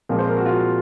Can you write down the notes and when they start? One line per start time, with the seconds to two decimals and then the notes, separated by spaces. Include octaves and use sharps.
0.09 A#2 F3 G#3 C4 A#4
0.19 C5
0.28 A#4
0.37 F#4
0.45 F4